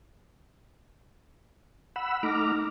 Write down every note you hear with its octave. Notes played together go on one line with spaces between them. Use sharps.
F#5 B5 E6
A3 D#4 A#5 D6 F6